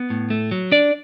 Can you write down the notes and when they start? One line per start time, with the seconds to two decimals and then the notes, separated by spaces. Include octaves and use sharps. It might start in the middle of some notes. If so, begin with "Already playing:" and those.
Already playing: B3
0.10 A2
0.30 A3
0.51 F#3
0.72 D4 D5